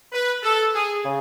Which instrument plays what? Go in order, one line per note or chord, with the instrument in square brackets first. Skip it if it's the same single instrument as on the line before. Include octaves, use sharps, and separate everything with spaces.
[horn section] B4
A4
G#4
[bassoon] C#3